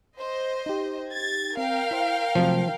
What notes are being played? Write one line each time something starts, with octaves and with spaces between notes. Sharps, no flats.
C5 D#5
D#4 G4
G#6 A6
C4 A#4 F5 G5
E4 C5
C3 F3 F#3 A3